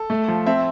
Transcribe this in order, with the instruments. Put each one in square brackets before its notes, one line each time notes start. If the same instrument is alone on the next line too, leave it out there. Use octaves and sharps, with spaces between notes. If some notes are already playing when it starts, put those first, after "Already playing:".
Already playing: [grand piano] A4
A3
F3
C4 E5